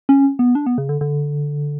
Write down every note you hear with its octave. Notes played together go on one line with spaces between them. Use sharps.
C#4
B3
D4
B3
C#3
D3
D3